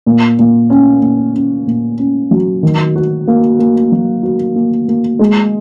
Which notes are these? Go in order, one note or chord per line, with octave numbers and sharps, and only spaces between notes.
A#2
A#2
C#4
A#2
C#4
A#2
C#4
F#3
D#3
F#4
A#3
A#3
F#3
F#4
A#3
A#3
G#3